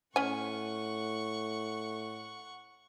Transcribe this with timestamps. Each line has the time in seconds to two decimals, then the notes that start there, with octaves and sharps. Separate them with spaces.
0.16 A2 C#4 F#5 G#5 C#6